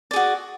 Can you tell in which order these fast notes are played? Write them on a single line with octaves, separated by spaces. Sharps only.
D5 G#4 F#4